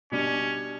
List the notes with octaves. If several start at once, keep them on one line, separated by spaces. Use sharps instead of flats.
B2 G3 C#4 D4